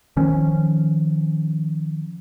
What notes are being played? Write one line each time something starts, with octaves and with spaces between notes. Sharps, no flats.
D#3 F3 C#4